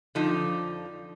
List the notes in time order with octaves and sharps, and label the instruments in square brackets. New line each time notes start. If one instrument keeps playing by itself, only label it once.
[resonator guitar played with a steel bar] F2 D3 F3 D#4